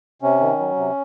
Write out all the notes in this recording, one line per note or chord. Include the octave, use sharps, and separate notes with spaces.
C3 C#4
D#3
F#3
C3